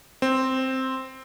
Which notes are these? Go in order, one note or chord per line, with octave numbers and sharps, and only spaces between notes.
C4